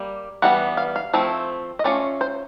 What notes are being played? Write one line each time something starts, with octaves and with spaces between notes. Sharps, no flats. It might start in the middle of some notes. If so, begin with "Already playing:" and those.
Already playing: G3 A#3
E3 G3 B3 F#5
F5
F5
F3 A3 C4 E4
D#5
A3 C#4 F4 D5
C5